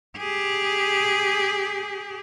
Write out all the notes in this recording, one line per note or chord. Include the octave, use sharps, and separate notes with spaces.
G4 G#4